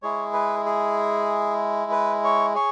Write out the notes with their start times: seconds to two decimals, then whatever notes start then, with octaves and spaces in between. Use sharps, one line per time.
0.02 G#3 E4 G#4 C#5
0.34 B4
0.66 G#4
1.91 B4
2.24 C#5
2.55 G#4 C#5